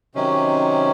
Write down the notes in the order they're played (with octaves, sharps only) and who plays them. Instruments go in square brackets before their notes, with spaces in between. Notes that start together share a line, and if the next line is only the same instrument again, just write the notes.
[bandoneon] C3 D#3 F#3 C#4